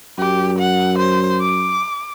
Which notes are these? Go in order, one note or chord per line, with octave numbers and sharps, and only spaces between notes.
F#2 G4
F#5
C5
D6